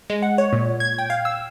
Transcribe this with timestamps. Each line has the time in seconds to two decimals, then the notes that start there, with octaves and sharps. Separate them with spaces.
0.10 G#3
0.22 F#5
0.38 C#5
0.53 A#2
0.80 G#6
0.98 G5
1.10 F5
1.25 E6